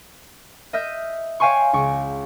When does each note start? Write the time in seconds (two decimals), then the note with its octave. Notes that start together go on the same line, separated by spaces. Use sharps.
0.73 D#5 E5 F6 G6 D#7
1.40 C#5 F5 G5 G#5 C6 C#6
1.73 C#2 G5 C#6